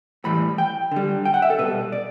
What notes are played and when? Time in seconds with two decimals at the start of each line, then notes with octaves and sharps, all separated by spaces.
0.24 A2 E3 G3 B5
0.58 G5
0.92 D3 G3
1.25 G5
1.34 F#5
1.42 E5
1.50 A4
1.59 B2 G3 B4
1.92 D5